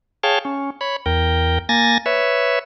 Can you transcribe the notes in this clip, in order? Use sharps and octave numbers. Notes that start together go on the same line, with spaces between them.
G#4 C#5 F5 G5 A5
C#4
C#5 B5
E2 A#4 G5
A#3 G#5 A6 A#6
B4 C#5 E5